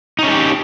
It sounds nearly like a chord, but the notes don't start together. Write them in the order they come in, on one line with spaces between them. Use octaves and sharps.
D#4 C#4 A4 G4